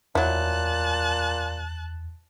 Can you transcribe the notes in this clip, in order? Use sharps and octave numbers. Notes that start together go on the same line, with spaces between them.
E2 A#2 F#3 E4 A5 F#6